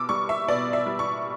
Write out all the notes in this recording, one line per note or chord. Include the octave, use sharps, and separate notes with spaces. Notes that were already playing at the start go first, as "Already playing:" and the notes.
Already playing: B2 D6 E6
G3 C#6
E5
B2 D5
E5
G3
C#6